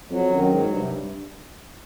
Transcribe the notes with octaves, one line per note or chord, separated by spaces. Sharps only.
F2 F#3
F#2 D#3
G#2 F#3
G2 C3